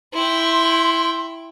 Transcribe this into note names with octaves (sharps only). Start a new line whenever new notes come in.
E4 G5 C6